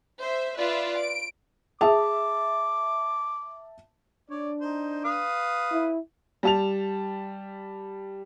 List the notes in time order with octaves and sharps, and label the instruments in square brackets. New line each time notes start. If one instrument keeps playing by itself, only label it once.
[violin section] C5 E5
F4 B4 D5 E5
D7
[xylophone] G#4 [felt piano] E5 A5 [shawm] D6
[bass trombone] D4 [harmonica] C#5 D5
[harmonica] D#4 C5
B4 F5 D#6
[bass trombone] E4
[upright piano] G3 A5 F7